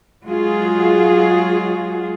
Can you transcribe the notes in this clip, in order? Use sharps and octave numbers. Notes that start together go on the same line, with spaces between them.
F#3 G#3 F4 F#4 G#4